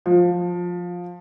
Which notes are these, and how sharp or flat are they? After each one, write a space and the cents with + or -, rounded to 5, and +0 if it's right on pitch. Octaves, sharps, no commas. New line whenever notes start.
F3 +15